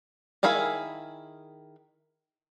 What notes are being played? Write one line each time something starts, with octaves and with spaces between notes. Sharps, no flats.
D#3 E4 G#4 F5 B5